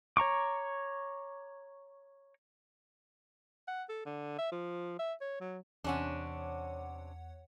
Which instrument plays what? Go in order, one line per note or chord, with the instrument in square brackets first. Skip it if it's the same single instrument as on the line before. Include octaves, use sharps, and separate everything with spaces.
[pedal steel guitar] C#5 A#5 C#6 D6
[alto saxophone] F#5
A4
D3
E5
F3
E5
C#5
F#3
[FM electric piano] E2 C#5 F#5 [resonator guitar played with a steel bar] C3 C#4 D4